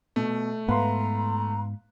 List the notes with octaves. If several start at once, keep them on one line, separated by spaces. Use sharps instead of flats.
B2 A3
G#2 B3 B4 F5 A#5 C6